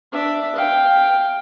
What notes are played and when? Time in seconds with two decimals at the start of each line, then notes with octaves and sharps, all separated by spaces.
0.12 D4 E5
0.55 F5 G5